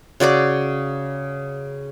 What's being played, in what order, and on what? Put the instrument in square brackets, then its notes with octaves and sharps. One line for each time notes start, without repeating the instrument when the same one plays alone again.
[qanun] C#3 F#4 D5 D6